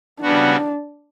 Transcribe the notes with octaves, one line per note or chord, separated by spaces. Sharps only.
C#3 G3 B3 D4 F#4